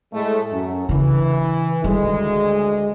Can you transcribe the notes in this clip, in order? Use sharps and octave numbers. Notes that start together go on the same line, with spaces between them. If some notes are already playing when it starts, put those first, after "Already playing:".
A2 G#3 A3
F#2
C#3 E3 D4
D2 D#3 G3 G#3